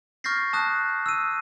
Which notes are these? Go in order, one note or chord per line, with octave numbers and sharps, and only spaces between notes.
C#6 F6 G6 A6 A#6 C7
A5 D#6 F#6
E6 D#7